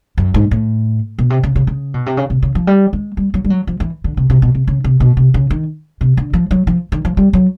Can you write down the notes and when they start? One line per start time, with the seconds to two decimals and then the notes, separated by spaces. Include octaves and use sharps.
0.18 F#2
0.34 G#2
0.51 A2
1.19 B2
1.30 C3
1.43 C#3
1.56 C#3
1.67 C#3
1.94 B2
2.06 C3
2.17 C#3
2.30 C3
2.42 C#3
2.55 F3
2.67 G3
2.93 G#3
3.17 G3
3.34 F#3
3.44 G3
3.50 F#3
3.67 F3
3.80 E3
4.04 D3
4.17 C3
4.30 C3
4.42 B2
4.55 C3
4.67 C#3
4.84 C3
5.00 B2
5.17 C3
5.34 C#3
5.50 D#3
6.01 C3
6.17 D3
6.33 F3
6.51 F#3
6.67 F3
6.92 D#3
7.05 F3
7.17 G3
7.33 F#3